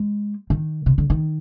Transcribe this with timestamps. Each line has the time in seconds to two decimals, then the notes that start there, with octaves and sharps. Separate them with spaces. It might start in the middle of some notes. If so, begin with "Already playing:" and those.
Already playing: G#3
0.50 D#3
0.86 C3
0.98 D3
1.10 D#3